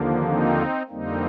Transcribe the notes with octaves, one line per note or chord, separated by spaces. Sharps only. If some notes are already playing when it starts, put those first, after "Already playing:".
Already playing: D#2 D3 F3 A#3
C4 D#4
F2 D3 G3 A#3 C4 D#4